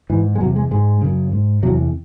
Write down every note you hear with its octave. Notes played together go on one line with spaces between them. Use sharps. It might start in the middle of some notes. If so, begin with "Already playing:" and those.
G#2 E3
G#3
E2 C3 F#3
G#3
G#2 G#3
F#2 C#3
G#2
E2 C3 F#3